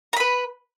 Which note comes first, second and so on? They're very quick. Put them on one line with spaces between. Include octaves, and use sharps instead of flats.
A#5 B5 B4